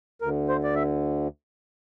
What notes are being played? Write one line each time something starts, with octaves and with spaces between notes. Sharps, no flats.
D2 D3 A#4
C5
D5
E5